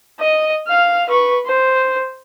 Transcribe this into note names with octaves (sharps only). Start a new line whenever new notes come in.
D#5
F5 F6
B4 C#6
C5